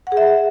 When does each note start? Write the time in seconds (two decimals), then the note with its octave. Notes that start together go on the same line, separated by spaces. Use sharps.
0.07 F#5
0.12 G#4
0.17 E5